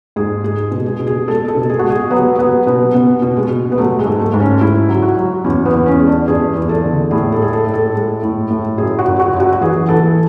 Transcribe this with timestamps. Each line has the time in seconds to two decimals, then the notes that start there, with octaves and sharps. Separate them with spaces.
0.16 G#2 G#4
0.44 G#3 G#4
0.71 B2
0.86 G#4
1.00 B2
1.07 G#4
1.28 G#3 A4
1.48 A4
1.55 B2
1.70 G#4
1.79 G#3 F#4
1.90 G#4
2.11 F#3 B3
2.39 F#3 B3
2.67 B2 B3
2.94 B2 B3
3.22 B2
3.37 G#3
3.50 B2
3.72 B3
3.78 F#3 A3
3.99 G#3
4.06 G#2
4.20 A3
4.34 G#2
4.40 C#4
4.61 G#2 E4
4.89 F#3
5.02 F#4
5.17 F#3
5.44 E2 C#4
5.65 B3
5.72 E2
5.86 C#4
5.99 G#3
6.07 D4
6.28 E2 G#4
6.56 E2
6.69 A4
6.84 D3
7.11 A2 G#4
7.32 A4
7.39 G#3 G#4
7.53 A4
7.67 A2
7.74 A4
7.95 G#3
8.23 A2
8.50 A2
8.78 F#2 G#4
8.99 F#4
9.06 F#2
9.20 F#4
9.33 F#2
9.40 F#4
9.52 F#4
9.61 E3 G#4
9.89 E3 A4